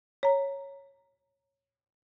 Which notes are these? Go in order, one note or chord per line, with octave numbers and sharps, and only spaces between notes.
C#5 A#5